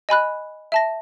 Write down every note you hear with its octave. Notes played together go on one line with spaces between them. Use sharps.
D#5 G#5 B5 F#6
E5 A5 A#6